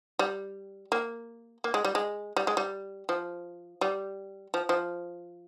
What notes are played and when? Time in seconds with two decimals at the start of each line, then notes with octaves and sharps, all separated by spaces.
0.19 G3
0.92 A#3
1.64 A#3
1.74 G#3
1.85 G3
1.95 G#3
2.37 G3
2.47 G#3
2.57 G3
3.09 F3
3.81 G3
4.54 F3
4.69 F3